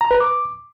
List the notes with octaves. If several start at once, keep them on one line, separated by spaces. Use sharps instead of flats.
A#5
B4
D6